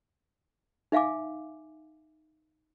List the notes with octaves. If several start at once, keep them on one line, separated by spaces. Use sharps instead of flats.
D#4 E5 F5 G#5 D6